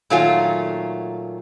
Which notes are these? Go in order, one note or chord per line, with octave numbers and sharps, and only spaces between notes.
A#2 D#3 F#3 A3 F4 G#5